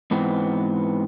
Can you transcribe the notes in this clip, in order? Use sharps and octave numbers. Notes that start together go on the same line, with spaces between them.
G#2 E3 B3 C4